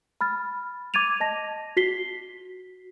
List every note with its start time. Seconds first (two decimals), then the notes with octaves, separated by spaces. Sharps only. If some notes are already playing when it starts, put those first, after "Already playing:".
0.21 B5 F6 A6
0.94 D6 G#6 A6 D#7 F7
1.20 D#5 A5 A#6
1.77 F#4 B6 C7 G7